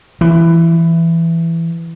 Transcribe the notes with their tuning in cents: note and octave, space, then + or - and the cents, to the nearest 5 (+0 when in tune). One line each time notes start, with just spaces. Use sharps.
E3 +10